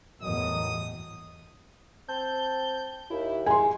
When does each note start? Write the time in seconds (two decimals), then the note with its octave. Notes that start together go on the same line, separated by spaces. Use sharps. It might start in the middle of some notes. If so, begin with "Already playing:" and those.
0.22 G1 E2 A2 E3 F#3 A#4 D#5 D#6
2.08 C4 A5 G6
3.10 D#2 E4
3.46 G#3 G#5 C6